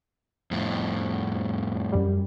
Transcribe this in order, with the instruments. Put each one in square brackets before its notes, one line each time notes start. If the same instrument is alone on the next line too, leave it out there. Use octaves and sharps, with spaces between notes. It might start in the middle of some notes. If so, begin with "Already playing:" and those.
[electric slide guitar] F2 A2
[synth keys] F#2 G3